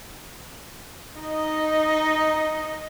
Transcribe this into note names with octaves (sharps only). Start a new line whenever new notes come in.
D#4 D#5